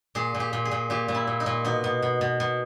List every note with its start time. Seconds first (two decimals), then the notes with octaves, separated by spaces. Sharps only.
0.15 A#2 G#4
0.34 A#2
0.40 G4
0.53 A#2
0.65 G#4
0.71 A#2
0.90 A#2 G4
1.08 A#2
1.14 E4
1.27 A#2
1.40 D#4
1.46 A#2
1.65 B2 D#4
1.84 B2
2.02 B2
2.21 B2
2.40 B2